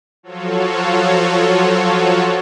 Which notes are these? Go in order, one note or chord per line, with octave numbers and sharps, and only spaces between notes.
F3 F#3 F4 F#4 A4 C#5